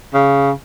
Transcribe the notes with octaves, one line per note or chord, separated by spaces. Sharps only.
C#3